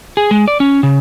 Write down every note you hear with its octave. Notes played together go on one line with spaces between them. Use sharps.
G#4
G#3
D5
C#4
C#3